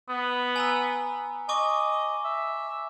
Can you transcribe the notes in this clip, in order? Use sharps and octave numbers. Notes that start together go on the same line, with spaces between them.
B3
G#5 A#5 E6
D#5 G#5 C#6 D6
E5